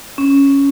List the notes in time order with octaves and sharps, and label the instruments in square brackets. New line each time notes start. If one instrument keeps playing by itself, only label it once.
[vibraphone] C#4